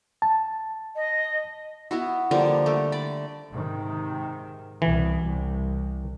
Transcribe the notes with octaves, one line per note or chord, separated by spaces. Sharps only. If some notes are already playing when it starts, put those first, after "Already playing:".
A5
D#5
B3 E4 F#4
D3 F3 G3 A#3
G3 A3
D5 B5
G#2 C3 D#3
C2 B2 E3
C2